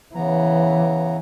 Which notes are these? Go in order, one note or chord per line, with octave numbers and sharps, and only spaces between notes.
C#3 E3 B3 A#5